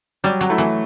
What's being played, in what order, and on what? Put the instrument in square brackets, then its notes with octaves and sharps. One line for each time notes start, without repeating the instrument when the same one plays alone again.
[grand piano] F#3 [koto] G3
[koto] F#3
[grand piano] A3 E4
[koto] E3